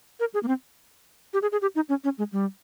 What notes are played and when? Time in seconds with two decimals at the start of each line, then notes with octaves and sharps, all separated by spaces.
0.20 A#4
0.34 G#4
0.43 A#3
0.48 C4
1.33 G4
1.42 G#4
1.52 G#4
1.62 G4
1.75 D#4
1.89 C#4
2.04 C#4
2.18 G#3
2.32 G3